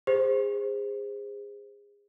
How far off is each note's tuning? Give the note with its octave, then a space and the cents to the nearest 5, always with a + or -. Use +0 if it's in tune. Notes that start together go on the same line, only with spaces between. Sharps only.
G#4 -30 C5 +0